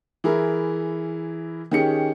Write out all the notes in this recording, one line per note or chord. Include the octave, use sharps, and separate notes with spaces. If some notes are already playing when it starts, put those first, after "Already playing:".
E3 E4 G#4 A#4
D#3 C#4 G4 G#4 C#7